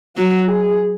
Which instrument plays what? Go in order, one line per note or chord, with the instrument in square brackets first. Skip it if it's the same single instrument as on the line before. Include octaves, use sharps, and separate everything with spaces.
[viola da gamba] F#3 [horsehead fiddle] F#4
[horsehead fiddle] G#4